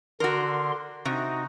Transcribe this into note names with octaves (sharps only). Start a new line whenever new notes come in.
D3 F#4 A#4 C6
C3 D#4 F#4